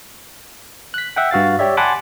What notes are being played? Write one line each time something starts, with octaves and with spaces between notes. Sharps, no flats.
F#6 B6
E5 F#5 G5
G2 F#4 F5 A6
G4 C#5 D5 E5
F#5 G#5 A5 B5 C6 D6